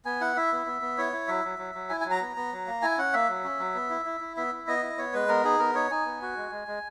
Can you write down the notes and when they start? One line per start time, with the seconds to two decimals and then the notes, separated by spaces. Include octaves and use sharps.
0.05 B3 G#5
0.21 E4 F#5
0.36 E4 E5
0.52 B3
0.66 B3
0.82 B3
0.98 E4 C#5
1.13 E4
1.28 F#3 E5
1.45 F#3
1.59 F#3
1.75 F#3
1.90 E4 G#5
2.01 G#5
2.06 F#3 A#5
2.21 B3
2.37 B3
2.52 F#3
2.67 A#3
2.82 E4 G#5
2.98 C#4 F#5
3.13 A#3 E5
3.29 F#3
3.44 C#4
3.59 F#3
3.75 B3
3.90 E4
4.06 E4
4.21 E4
4.37 B3 E5
4.52 E4
4.67 B3 D#5
4.83 E4
4.98 B3 C#5
5.14 G#3 B4
5.28 B3 A#4
5.44 D#4 G#4
5.59 B3 A#4
5.75 D#4 C#5
5.91 D#4 G#5
6.06 B3
6.22 F#4
6.37 G#3
6.52 G#3
6.68 G#3